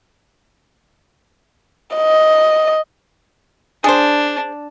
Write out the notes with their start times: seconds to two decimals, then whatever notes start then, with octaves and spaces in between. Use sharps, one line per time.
1.96 D#5
3.84 D4 G#4 C5